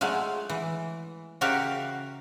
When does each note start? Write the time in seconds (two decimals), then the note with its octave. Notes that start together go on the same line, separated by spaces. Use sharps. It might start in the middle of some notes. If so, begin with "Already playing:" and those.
0.01 F#3 G#3 A3 F4
0.49 E3
1.41 C#3 F#4 G4 A#4 E5 F5